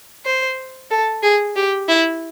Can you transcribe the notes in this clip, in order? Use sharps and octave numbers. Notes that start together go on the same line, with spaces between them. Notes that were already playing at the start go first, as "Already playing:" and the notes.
C5
A4
G#4
G4
E4